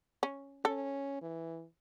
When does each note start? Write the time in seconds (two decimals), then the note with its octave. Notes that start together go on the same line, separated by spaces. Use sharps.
0.23 C#4
0.65 C#4 A4
1.21 E3